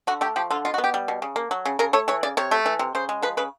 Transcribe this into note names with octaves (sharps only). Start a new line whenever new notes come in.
D3 F#4
A3 G4
F3 G4
D3 F4
B2 F4
F#4
B3
G4
G3
B2
C#3
A#3
F#3
C#3
C#3 A#4
A3 C#5
E3 C#5
C#3 D5
C3 C#5
A3
E3
C3
C#3 C5
G#3
F3 B4
C#3 B4